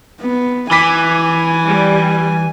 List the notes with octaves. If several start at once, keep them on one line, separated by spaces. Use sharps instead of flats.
B3
E3 G#5 B5 D6 B6
G3